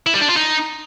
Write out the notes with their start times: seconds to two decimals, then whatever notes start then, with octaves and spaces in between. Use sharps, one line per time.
0.07 E4
0.14 G3
0.21 D4
0.29 F4
0.36 D#4